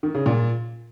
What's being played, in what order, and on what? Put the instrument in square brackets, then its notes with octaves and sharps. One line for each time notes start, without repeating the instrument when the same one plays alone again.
[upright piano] D#3
C#3
A#2